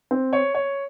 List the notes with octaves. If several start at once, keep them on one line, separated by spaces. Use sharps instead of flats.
C4
C#5
C#5